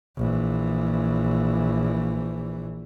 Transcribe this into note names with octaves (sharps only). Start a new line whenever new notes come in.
A#1 E3